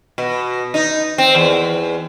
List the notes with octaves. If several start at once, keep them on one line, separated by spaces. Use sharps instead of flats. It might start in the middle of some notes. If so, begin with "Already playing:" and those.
B2
D#4
C4
E2